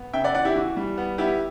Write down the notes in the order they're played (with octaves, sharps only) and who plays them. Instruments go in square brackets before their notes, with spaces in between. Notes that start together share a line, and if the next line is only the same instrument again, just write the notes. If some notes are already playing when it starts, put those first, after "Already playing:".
Already playing: [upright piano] B3
C#3 E5 G5
D5 F#5
E3 D5 F#5
E4 G4
E3 F#4
G3
B3
B3 E4 G4